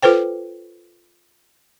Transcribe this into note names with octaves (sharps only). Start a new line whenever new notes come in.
F4 A4 B4 C5 G5